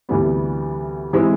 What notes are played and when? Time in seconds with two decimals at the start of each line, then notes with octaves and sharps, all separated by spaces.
0.09 D2 C3 E3 G3 B3
1.13 E3 G#3 C4 E4